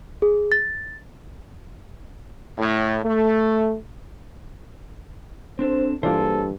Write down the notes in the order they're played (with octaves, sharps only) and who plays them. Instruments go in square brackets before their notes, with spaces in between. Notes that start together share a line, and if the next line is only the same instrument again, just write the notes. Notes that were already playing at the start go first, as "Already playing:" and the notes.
[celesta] G#4
A6
[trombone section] A2
A3
[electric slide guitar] C4 D4 A4 [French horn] C5
[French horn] G2 [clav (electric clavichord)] E3 D4 F4 [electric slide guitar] A#3 G#4 C5 [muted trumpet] A4